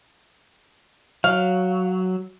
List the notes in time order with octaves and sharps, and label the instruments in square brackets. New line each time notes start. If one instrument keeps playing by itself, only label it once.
[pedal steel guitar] F#3 [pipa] F5